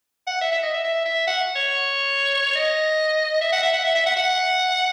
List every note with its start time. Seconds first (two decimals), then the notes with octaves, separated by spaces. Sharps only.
0.27 F#5
0.42 E5
0.52 E5
0.63 D#5
0.74 E5
0.84 E5
1.06 E5
1.27 F#5
1.56 C#5
2.55 D#5
3.41 E5
3.52 F#5
3.63 E5
3.73 F#5
3.84 E5
3.95 E5
4.06 F#5
4.16 F#5